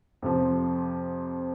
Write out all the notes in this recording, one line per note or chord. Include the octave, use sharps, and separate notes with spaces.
F2 C3 F3